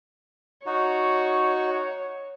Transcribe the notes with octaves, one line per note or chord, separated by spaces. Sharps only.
D#4 F#4 C#5